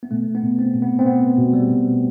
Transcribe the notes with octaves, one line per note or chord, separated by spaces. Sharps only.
B3
B2 A3
B3
B2
C4
B2
B3
C4
B2 B3
B2
G3
B2